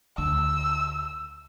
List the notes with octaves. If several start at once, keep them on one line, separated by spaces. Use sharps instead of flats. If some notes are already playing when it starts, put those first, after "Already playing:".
D2 E6